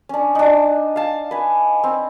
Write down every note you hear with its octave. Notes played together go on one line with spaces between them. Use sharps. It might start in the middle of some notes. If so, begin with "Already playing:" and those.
C#4 D4
D4 D#4
F5 A5
B4 G#5
C4